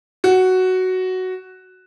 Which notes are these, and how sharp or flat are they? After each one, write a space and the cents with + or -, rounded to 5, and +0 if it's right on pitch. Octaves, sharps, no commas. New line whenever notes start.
F#4 +5